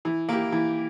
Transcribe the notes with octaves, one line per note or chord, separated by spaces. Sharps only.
E3
A#3 E4 G4
E3